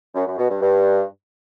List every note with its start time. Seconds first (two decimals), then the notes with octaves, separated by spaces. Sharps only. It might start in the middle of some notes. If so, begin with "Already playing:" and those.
0.15 F#2
0.26 F#2
0.38 B2
0.50 G2
0.61 G2